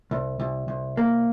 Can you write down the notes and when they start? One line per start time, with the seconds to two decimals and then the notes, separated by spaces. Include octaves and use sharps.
0.11 C2
0.40 C2
0.68 C2
0.97 A#3